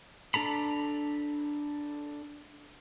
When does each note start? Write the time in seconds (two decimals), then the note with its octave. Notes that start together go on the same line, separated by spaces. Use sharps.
0.34 D4 A4 A#5 B5